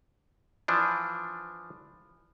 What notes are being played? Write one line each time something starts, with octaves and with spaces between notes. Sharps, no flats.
E3 F3 D4